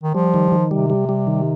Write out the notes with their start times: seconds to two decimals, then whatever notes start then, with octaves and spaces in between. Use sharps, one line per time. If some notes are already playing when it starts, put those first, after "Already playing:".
0.03 D#3
0.14 F3 G3
0.34 D#3
0.52 D#3
0.71 C3 G3
0.90 G3
1.09 G3
1.27 D#3